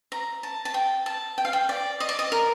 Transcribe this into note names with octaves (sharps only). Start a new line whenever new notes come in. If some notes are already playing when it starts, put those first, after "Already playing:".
A#5
A5
A5
G5
A5
G5
F5
G5
D5
D#5
D5
D#5
A#4